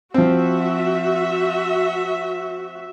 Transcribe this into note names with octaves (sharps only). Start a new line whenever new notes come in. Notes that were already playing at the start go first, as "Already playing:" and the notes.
F3 C4 F#4 E5